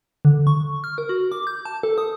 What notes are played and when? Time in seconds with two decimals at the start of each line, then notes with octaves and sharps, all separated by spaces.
0.25 D3
0.47 C#6
0.84 F6
0.98 A#4
1.09 F#4
1.32 D6
1.47 G6
1.65 A5
1.83 A4
1.98 D#6